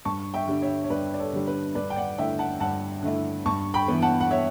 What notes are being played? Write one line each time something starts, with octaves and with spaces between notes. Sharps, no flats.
G2 A5 C#6
E5 G5
D3 G3 D4
C#5 E5
C#5
G2 B4 D5
D5
A4 C#5
D3 G3 D4
B4
G2 B4 D5
G5
D5 F#5
D3 A3 E4 E5 G5
F#5 A5
G2 F#5 A5
D3 A3 E4
G2 A5 C#6
G5 B5
E3 B3
F#5 A5
F#5
C#5 E5